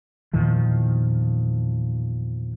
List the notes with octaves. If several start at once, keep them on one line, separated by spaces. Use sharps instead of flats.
E2 A#2 D#3 F3